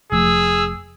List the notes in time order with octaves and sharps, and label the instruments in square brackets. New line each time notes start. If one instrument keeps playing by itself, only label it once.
[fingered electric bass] F1 F3 A3 [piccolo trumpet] G#4 [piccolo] E6